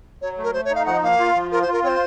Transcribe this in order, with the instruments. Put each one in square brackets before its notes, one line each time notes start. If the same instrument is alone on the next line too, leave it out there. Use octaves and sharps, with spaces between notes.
[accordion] F#3 [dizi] C#5
[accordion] A3
[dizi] A#4
[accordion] A3 [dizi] C5
[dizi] C#5
[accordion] D#4
[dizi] F5
[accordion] F3 [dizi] F#5
[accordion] A#3 [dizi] F5
[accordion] F4
F3
[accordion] F4 [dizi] A#4
[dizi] C5
[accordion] F4
[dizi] A#4
[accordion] C4 [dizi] C#5
[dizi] C5